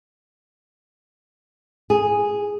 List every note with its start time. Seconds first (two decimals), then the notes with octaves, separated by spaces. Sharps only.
1.90 G#4